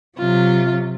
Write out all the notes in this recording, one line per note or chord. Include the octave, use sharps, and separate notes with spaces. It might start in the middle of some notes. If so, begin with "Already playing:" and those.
C3 F#3 F4